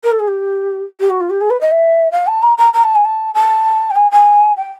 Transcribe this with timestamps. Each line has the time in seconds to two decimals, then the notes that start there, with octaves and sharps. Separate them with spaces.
0.03 A#4
0.11 A4
0.19 G#4
0.27 G4
1.00 G4
1.10 F#4
1.20 F4
1.30 G4
1.40 G#4
1.50 B4
1.61 D#5
1.71 E5
2.11 F5
2.27 A5
2.42 A#5
2.57 A#5
2.73 A#5
2.83 A5
2.95 G#5
3.05 A5
3.34 A5
3.90 G5
3.95 G#5
4.11 G#5
4.57 G5